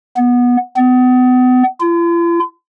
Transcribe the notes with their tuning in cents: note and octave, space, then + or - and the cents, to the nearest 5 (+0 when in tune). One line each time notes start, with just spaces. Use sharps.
B3 -15
B3 +35
F4 -45